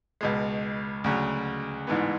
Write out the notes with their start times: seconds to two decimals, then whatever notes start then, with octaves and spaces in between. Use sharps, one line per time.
0.21 C#2 B2 G#3
1.04 D2 C#3 F#3
1.87 A1 G#2 E3 B3